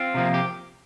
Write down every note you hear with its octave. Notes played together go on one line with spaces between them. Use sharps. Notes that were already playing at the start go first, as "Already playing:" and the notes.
Already playing: C4 F4
C3 F3 A#3
G4